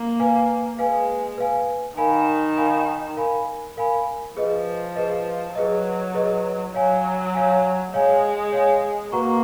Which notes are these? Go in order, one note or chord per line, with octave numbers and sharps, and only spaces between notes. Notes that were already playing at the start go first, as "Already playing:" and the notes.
Already playing: A#3
B4 F5 G#5
G#3 B4 F5 G#5
B4 F5 G#5
D#3 A#4 F5 G#5 B5
A#4 F5 G#5 B5
A#4 F5 G#5 B5
A#4 F5 G#5 B5
F3 G#4 B4 D#5
G#4 B4 D#5
F#3 G#4 B4 D#5
G#4 B4 D#5
F#3 C#5 F5 G#5
C#5 F5 G#5
G#3 C#5 F5 G#5
C#5 F5 G#5
A#3 F#4 B4 F#5 A#5 C#6